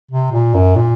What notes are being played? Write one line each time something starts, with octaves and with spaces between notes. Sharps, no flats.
C3
A#2
F#2
A#2